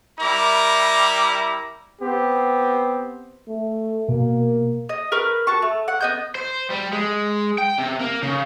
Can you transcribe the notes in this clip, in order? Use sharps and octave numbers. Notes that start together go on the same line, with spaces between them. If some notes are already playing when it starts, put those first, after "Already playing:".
G3 E4 A#4 A#5 D6
B3 C4 G4
A3
B2 A#3
D#5
A#4 B4 C#6 F6
F#4 A5 C#6
A3
F#5
B3 D#5 G6
C5
G3
G#3
G5
C3
A#3
C#3